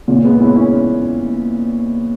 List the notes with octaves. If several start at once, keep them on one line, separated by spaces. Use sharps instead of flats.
A#2 C#3
G#3 B3
C#4 E4
C#4 E4